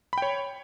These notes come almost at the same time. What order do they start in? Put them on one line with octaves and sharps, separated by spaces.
B5 G5 C#5